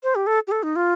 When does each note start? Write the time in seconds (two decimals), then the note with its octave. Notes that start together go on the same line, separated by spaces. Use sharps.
0.03 C5
0.15 G4
0.27 A4
0.47 G4
0.51 A4
0.63 D#4
0.76 F4